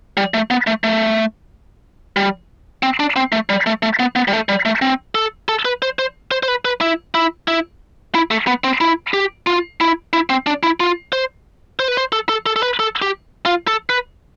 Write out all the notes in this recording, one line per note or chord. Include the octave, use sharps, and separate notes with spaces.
G3
A3
B3
A3
A3
G3
C4
D4
C4
A3
G3
A3
A3
B3
B3
G3
A3
G3
A3
C4
A4
A4
B4
C5
C5
C5
C5
B4
B4
E4
E4
E4
E4
A3
B3
C4
E4
G4
F4
E4
E4
C4
D4
E4
F4
C5
C5
B4
C5
A4
A4
A4
A4
B4
A4
G4
F4
A4
B4